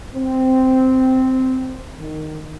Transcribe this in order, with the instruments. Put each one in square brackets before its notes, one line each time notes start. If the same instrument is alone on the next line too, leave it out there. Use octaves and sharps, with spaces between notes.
[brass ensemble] C4
D#3